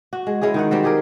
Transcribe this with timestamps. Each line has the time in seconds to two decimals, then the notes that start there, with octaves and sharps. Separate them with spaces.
0.13 F#4
0.27 G#3
0.41 G#3 C#4 E4 G#4
0.54 D#3 D#4 F#5
0.71 F#3 G3 C4
0.83 G4 G#4 A#4